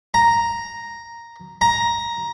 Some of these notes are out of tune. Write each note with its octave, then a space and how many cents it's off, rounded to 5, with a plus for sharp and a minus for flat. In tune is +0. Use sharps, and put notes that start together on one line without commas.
A#5 +0
A#5 +10